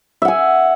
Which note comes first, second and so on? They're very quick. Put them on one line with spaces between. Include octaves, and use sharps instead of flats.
E5 F#5 G#5